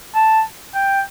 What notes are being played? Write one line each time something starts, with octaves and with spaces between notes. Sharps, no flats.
A5
G5